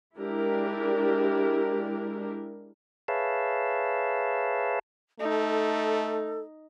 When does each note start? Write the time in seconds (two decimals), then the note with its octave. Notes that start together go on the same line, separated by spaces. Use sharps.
0.17 G#3 D4 E4 G4 A#4
3.08 G#4 B4 C#5 E5 F5 A5
5.20 A3 D#4 A4